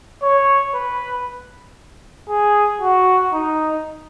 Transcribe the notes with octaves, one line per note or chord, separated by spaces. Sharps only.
C#5
B4
G#4
F#4
D#4